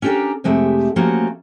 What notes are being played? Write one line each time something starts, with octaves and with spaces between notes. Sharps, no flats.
C#4 D4 G4 A4 A#4 G5
F2 C3 G#3 A3 G4 E5
F3 A3 A#3 C#4 F#4 G4